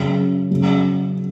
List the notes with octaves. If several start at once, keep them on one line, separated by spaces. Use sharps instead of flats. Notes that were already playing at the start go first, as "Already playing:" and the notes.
Already playing: F#2 C#3
F#2 C#3